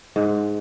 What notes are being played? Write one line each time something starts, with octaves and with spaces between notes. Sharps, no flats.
G#2